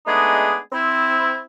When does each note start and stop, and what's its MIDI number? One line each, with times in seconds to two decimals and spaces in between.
0.07 0.58 56
0.07 0.58 57
0.07 0.58 59
0.07 0.58 62
0.07 0.58 63
0.07 0.58 68
0.72 1.41 60
0.72 1.41 64